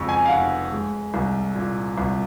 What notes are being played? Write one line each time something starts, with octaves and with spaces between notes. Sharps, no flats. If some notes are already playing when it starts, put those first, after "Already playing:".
Already playing: F2 C#3 G#3 C#6
G#5
F5
F1 F#5
G#3
C2
A#2
C2